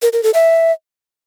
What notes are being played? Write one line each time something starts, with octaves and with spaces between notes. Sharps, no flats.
A#4
A#4
A4
E5